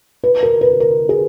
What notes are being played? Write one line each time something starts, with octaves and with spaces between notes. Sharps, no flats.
B4
A#4
B4
A#4
G#4